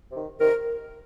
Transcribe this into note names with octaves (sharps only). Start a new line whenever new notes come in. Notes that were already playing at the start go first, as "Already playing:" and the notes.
C3 D#3
C3 D#3 A#4